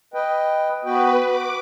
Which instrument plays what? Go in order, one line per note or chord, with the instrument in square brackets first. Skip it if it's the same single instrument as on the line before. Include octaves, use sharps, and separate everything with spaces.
[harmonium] B4 D#5 G5
[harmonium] B3 F#4 G5 [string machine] B4
[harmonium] F#4 [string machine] D6